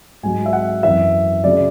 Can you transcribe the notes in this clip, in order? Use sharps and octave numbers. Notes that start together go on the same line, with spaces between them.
G#2 F#3 G#5
E5
F#5
F#2 E3 E5
C#3 F#3 D5